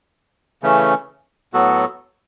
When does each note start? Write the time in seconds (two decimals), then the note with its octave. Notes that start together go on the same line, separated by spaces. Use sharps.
0.63 C#3 E3 A3 C#4
1.53 A2 F#3 B3 F#4 A4